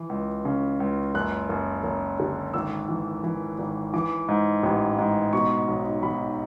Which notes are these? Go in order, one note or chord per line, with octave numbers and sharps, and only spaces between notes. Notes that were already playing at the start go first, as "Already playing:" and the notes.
Already playing: E3
C#2
C#3
C#2
F#1 F#6
F#1
F#1
D3
G#1 E6
E3
E3
G#1
E3 D6
G#2
A1
G#2
B2 C#6
B1
B1 B5